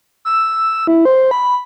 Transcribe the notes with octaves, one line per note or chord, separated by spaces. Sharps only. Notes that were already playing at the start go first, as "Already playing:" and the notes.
E6
E4
C5
B5